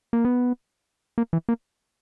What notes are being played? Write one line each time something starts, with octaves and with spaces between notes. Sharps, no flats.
A#3
B3
A#3
E3
A#3